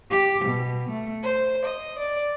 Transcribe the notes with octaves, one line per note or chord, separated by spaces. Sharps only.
G4
B2
A3
C5
D#5
D5